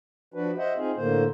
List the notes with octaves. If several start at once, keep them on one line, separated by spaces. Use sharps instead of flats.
F3 D4 F#4 B4
C5 D#5 E5 F#5
C4 D#4 F4 G#4
A2 D3 A#3 C5